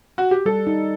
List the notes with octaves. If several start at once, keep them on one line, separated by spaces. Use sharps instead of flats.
F#4
G4
G3 A4
D#4